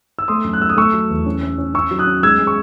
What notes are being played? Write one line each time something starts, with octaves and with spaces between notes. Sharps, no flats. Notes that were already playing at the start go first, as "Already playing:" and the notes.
E6
A3 C6 D#6
F#2
F#6
A3 E6
D#6
A3 C#6 E6
F#3
E2
C#4
C#4
C#4
C#4 C#6 E6
F#3
D#6 F#6
C#4
G#3 E6 G#6
G#3
C#6